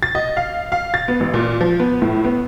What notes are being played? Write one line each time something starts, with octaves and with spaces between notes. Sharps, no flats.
A6
D#5
F5
F5
A6
B3
A1
A#2
F3
B3
A2
B3